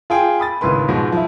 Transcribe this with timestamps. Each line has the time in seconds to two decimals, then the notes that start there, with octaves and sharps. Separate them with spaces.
0.10 F4 G#4 G5
0.40 B5 D#6 A6
0.61 G#1 C#2 A2 B4 C6
0.88 G#2 B2 F3 F#4
1.12 F3 E4